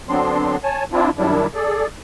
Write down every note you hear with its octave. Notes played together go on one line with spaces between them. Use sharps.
D3 F#3 B3 C4 D4 C6
C#5 G#5 A5
C4 D4 E4 F4
F#2 D#3 F#3 G3 D4 E4
G#4 A4 D5